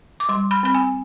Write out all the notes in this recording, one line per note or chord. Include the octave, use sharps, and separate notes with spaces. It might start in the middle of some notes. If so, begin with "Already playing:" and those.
D6
G3 C6
B5
C4 B5
G#5